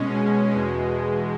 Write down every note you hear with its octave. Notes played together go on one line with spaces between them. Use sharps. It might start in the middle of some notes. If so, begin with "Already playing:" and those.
Already playing: B2 G#3 C#4
E2 B2 G#3